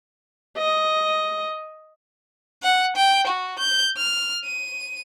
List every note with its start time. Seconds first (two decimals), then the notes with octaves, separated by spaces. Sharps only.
0.57 D#5
2.63 F#5
2.96 G5
3.27 F#4
3.59 G6
3.97 F6
4.45 D#7